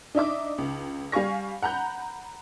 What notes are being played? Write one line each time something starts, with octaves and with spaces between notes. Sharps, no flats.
D4 D#4 E5 D6
C#2
G3 F5 G#5 C#6 A#6
F#5 A#5 B5 G6